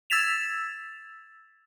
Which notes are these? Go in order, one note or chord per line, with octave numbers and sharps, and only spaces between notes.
E6 G#6 A6 B6 E7 F7